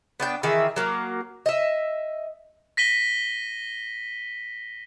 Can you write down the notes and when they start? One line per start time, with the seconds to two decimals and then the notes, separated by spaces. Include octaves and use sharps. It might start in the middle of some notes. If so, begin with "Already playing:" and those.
0.20 B3 D4 G5
0.43 D#3 E3 G#4 E5
0.76 F#3 A#3
1.46 D#5 E5
2.77 A#6 B6 D#7 G7